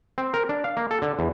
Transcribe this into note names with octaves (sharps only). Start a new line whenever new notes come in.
C4
A#4
D4
F5
A#3
A4
D3
E2